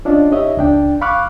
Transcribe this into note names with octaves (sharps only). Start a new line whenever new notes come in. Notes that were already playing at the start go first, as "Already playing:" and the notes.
C#4 D4 F4 D#5
D#4 G4 C#5 D#5 E5
C#2 D4 G5
F5 B5 C#6 D6 F6 F#6